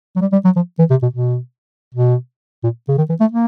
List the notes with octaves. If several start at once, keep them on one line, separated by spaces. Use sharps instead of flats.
F#3
G3
G3
F#3
F3
E3
C3
B2
B2
B2
A#2
C#3
D#3
E3
A3
A#3